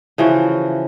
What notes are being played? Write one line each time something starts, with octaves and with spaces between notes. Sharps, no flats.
C#3 E3 F3 F#4